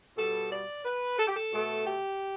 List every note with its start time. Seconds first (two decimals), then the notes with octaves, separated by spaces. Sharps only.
0.17 B2 G3 A4
0.51 D5
0.85 B4
1.18 A4
1.27 G4
1.35 A4
1.53 B2 A3
1.85 G4